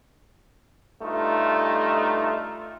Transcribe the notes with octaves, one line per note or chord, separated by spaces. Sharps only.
G2 A3 D#4 F4